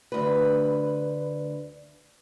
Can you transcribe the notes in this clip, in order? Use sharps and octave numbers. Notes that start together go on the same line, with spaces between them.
D2 B4